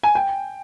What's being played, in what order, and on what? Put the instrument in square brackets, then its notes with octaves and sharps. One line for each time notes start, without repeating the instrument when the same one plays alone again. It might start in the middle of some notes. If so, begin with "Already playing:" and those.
[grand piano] G#5
G5